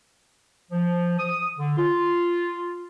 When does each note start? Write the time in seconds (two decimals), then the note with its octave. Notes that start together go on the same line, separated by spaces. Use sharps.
0.72 F3
1.19 D#6
1.58 D3
1.77 F4